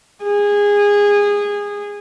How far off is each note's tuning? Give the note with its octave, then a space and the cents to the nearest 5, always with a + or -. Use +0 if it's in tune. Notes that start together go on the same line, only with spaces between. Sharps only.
G#4 -20